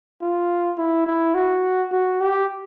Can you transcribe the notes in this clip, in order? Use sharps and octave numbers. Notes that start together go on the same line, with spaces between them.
F4
E4
E4
F#4
F#4
G4